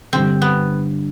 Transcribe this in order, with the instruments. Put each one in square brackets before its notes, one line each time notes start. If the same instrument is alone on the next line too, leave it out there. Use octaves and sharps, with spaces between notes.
[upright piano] G2 D3 G3 [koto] C4
[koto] B3